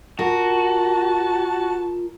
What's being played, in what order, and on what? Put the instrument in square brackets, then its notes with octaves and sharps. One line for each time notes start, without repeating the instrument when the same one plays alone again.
[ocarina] F4 [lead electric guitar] F#4 [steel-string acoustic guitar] A#4 [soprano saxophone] A5